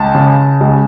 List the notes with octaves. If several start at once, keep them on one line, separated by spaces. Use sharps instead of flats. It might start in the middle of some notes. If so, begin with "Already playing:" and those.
Already playing: C#2 A5
C#3
C#2